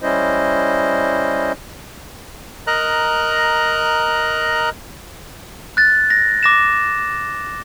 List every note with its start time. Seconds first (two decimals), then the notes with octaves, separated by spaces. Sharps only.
0.02 G3 C#4 E4 C5 D#5
2.67 A#4 D#5 A#5 F#6
5.77 F#6 A6
6.10 A#6
6.43 D6 A#6 E7